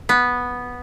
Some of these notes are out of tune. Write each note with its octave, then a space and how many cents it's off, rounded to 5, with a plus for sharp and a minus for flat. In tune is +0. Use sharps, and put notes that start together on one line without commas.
B3 -5